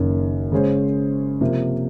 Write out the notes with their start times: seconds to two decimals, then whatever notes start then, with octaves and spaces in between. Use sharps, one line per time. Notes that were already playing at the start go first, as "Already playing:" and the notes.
Already playing: F#1 F#2 D#3 A#3
0.52 C#3 G#3 C#4 G#4 C5
1.41 C3 F3 A#3